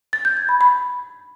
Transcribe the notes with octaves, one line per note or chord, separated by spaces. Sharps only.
A6
G6
G#6
B5
B5